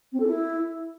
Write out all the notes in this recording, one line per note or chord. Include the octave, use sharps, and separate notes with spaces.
C4
A4
E4